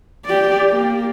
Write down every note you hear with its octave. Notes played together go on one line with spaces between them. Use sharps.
G4 D5
A#3